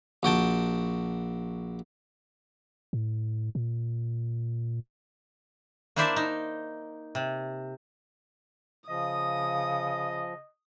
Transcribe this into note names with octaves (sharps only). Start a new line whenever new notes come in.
A#1 F#4 G5 A5
A2
A#2
A#3 D4 E4 C5 D5 E5
D#4
C3
C#3 F3 D#5 D#6